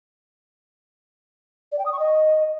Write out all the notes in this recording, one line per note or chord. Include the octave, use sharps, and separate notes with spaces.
D5
G5
D#6
C#6
D#5